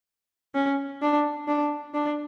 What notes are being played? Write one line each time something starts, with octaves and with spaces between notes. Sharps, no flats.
C#4
D4
D4
D4